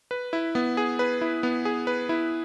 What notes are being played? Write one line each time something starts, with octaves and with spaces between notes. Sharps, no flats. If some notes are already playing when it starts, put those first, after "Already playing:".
B4
E4
B3
G#4
B4
E4
B3
G#4
B4
E4